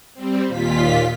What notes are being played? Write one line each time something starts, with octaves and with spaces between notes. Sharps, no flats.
G3 C4
D#2 A#2 F4 B6